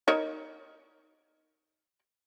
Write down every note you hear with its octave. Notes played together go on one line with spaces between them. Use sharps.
D#4 A#4 C#5